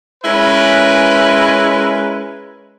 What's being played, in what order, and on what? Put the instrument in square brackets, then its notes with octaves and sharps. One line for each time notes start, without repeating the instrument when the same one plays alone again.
[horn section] G#3 C#4 E4 A#4 B4